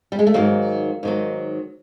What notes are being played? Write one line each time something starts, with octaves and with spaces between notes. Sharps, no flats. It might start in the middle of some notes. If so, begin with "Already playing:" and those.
G3
G#3
A3
G#2 D#3 F#3 A#3
G#2 D#3 F#3